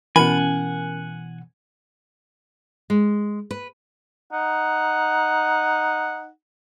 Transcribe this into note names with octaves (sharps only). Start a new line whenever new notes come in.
B2 E3 C#4 A#4 F#5 G#5 B5
G#3
B4
D#4 F#5